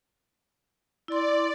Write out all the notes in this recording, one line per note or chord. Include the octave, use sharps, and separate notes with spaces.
E4 D5 C6